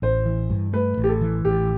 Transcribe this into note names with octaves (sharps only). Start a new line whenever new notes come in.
A1 C5
E3
G2
A3 B4
A1
G4
A4
E3
A1 G4